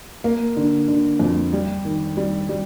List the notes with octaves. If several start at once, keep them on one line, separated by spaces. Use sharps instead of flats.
A#3
D3
D3
F2
G3
D#3
G3
G3